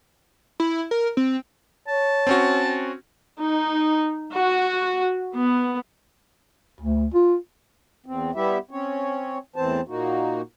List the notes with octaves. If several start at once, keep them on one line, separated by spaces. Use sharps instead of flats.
E4
A#4
C4
C#5 A5
C4 C#4 F#4
D#4
F#4
B3
D2
F4
E2 C4
G3 B3 E4 G4 E5
C4 C#4 C#5
E2 A2 E3 C4 C5 A5
A#2 A#3 D#4 F#4